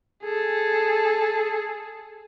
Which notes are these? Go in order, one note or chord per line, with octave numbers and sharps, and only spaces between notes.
G#4 A4